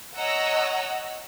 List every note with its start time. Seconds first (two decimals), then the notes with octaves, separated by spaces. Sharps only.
0.17 C#5 D#5 F#5 A#5 E6